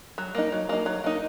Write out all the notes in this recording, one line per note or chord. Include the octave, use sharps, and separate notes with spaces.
F#3
A#3 D#4
F#3
A#3 D#4
F#3
A#3 D#4